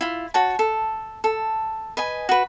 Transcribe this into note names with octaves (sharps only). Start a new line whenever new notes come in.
E4 F4
F#4 C#5 A5
A4
A4
B4 D#5 G#5
F#4 B4